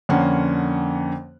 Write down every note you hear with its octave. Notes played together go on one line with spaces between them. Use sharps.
F2 D3 A#3 C#4 F#5